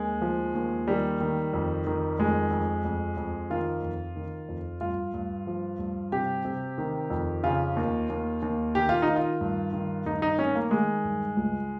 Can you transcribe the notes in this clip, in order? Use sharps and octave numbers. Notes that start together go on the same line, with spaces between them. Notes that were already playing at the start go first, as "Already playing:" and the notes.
Already playing: D#2 G#3
F3
D#2
D#3 G3
D#3
F2
D#3
F2 G#3
F2
F2
F2
D#3 F4
F2
D#3
F2
G2 F4
G2
F3
G2
C3 G4
C3
D#3
F2
C#3 F4
D#2
D#2
D#2
D#3 G4
F4
D#4
D#3
F4
G2
D#3
G2 D#4
D#4
D#3 C#4
A#3
D#3 G#3
G2
C#2